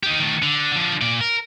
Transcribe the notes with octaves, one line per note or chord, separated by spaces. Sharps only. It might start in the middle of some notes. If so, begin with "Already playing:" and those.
D#4 G4
D#3 A3
D3
D3 F3
A#2 D5
A#4